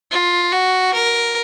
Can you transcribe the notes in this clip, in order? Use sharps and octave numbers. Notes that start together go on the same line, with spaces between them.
F4
F#4
A#4